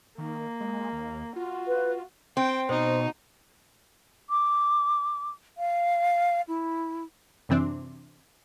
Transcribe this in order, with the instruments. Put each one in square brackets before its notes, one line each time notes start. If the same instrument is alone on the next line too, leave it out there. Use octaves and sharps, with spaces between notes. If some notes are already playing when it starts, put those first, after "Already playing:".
[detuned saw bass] D#3 [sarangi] A#3
[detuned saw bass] G#3
D#2
[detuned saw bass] F4 [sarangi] F#4
[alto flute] B4
[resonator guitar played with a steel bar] C4 [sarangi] G5
[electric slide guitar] B2 [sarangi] D#4 [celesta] C5
[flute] D6
F5
E4
[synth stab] F#2 C3 E3 C4 D4